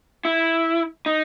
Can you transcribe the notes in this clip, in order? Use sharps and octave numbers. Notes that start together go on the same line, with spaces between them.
E4
D#4